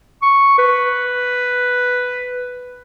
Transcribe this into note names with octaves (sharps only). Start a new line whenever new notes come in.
C#6
B4